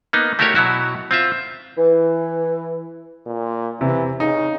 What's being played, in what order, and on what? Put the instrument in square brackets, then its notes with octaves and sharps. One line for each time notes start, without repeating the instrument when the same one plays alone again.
[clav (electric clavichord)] A#3 B3 D#4
A3 E4 F#4 G4 A#4 C#5
B2 F#3 E4 F#4
C4 F4 E5
[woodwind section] E3
[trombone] A#2
[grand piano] C3 [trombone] E3
[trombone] C#3 [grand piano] D#4